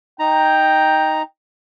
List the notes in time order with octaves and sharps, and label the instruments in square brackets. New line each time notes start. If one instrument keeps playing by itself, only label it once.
[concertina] D#4 A#5 [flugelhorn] G5